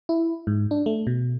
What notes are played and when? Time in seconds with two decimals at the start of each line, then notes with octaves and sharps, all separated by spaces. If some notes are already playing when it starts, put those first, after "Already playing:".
0.09 E4
0.47 G#2
0.71 D4
0.86 A3
1.07 B2